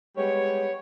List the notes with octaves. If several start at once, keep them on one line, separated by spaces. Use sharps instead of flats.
G3 G#3 B3 C#5